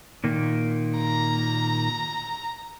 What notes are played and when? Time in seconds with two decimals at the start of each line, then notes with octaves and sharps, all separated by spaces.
0.24 A#2 D#3 A#3
0.98 A#5